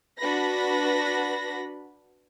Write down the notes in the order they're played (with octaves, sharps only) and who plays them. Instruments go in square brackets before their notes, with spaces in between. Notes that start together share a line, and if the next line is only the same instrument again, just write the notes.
[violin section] D4 F#4 B4 B5 A#6